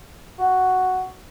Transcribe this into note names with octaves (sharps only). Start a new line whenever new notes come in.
F#4